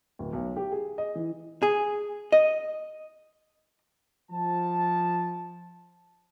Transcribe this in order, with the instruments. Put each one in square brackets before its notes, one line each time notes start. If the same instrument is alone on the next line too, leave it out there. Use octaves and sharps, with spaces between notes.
[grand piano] D1
B1
G4
G#4
D#5
E3
[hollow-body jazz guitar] G#4
D#5
[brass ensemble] F3 A5